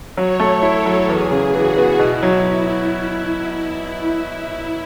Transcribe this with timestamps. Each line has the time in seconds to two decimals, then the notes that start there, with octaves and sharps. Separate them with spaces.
0.17 F#3 C#5
0.40 A3
0.62 E4 A4
0.86 F#3
1.08 E2 G#4
1.31 C#3
1.54 E3 F#4
1.77 B3
1.99 B2 E4
2.23 F#3